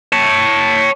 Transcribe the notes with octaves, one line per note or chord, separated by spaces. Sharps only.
C#5 A5